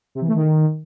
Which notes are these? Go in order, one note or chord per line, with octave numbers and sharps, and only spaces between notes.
C3
E3
A3
D#3